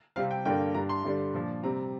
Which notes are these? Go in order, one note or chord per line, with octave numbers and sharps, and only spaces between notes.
C3 G3 C4 F5
G5
G2 D3 A#3 D4 G5
G2 G3 D4 A#5
C6
G2 D3 G3 D4
A#2 F3 D4
C3 G3 C4 A#5